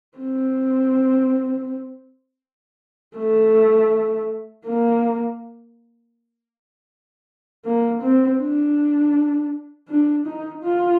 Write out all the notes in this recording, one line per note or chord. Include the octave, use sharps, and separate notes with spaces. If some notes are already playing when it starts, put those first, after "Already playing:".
C4
A3
A#3
A#3
C4
D4
D4
D#4
F4